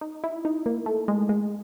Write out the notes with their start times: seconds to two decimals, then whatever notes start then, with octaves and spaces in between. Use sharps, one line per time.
0.01 D#4
0.24 E4
0.45 D#4
0.66 A#3
0.86 A3
1.08 G#3
1.29 G#3